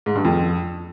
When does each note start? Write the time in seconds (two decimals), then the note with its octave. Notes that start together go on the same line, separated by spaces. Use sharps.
0.06 G#2
0.15 G2
0.25 F2